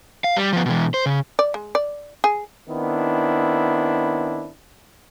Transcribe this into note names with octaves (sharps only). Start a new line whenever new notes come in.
F5
G3
F3 B3
B2 E3
C5
C#3
D5
G#3
D5
G#4
D#3 B3 C4 D4 E4